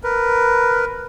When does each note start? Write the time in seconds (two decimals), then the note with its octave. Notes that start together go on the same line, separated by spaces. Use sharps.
0.03 A#4 B4